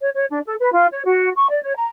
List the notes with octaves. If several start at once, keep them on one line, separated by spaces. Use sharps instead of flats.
C#5
C#5
D4
A4
B4
F4
C#5
F#4
C#6
D5
C#5
A#5